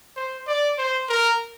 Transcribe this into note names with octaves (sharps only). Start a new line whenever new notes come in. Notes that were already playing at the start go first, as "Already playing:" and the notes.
C5
D5
C5
A#4